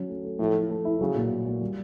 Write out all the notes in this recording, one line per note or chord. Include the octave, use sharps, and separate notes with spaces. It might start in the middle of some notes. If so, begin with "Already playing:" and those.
Already playing: F#3 C#4
A3
A3
A2 F3
E4
A3
E4
C#3 F#3
A#2
A#2
A#2
G3